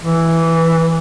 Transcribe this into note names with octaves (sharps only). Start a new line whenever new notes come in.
E3